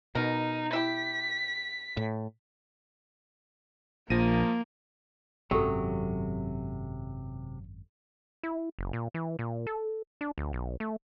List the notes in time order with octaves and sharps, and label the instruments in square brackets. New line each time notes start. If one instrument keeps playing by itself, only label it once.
[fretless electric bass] B2 [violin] D#4 [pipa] A#4
[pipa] E4 G4 [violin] B6
[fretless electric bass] A2
[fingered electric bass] A#1 [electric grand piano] F3 A#6 D#7 [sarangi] A#3
[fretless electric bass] G#1 F#2 [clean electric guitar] C3 [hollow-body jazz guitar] F#3 [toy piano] G4 A4
[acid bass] E4
F#1
A#2
E3
A#2
A4
D4
D2
B1
A3